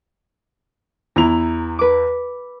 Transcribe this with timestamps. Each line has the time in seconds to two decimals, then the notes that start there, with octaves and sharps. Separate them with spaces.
1.16 E2 E4 A#5 F7
1.79 B4 D6